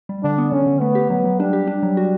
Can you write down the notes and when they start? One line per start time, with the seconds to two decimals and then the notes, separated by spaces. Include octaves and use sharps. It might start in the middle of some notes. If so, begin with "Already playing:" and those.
0.09 G3
0.23 D3 D4
0.38 B3
0.52 D3 C#4
0.66 D3
0.81 A3 B3
0.95 G4
1.10 F#3 B3
1.24 F#3
1.39 G3 D4
1.53 G4
1.67 D4
1.83 F#3
1.97 F#4